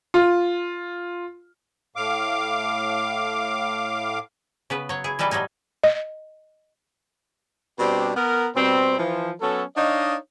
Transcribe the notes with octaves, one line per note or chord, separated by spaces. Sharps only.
F4
A2 F5 D6
C#3 B3 B4
F#3 C#5
E4 G#4
E3 G3 D#4 A4 B4
A2 F#3 G3 D#4 G#5
D#5
B2 G3 C4 D4 G4
B3 A#4
B2 G3 C4
E3 F3
F#3 B3 C#4 A4
D4 D#4 C#5 D#5 F5